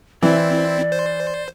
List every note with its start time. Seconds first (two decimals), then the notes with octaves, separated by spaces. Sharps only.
0.23 E3 C4 E4 D5
0.92 C5